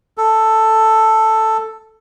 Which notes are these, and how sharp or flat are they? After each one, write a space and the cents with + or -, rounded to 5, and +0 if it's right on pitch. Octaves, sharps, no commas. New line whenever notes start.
A4 +5